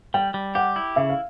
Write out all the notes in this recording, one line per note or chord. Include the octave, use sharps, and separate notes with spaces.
G3 G5
G3
G4 F#5
E4
C#3 E5
F5